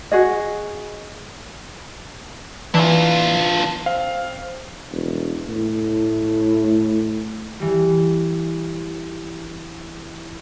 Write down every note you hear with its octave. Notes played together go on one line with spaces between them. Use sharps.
F#4 G#4 D#5
E3 D4 F4
C4 F5
E1
A2
E3 G3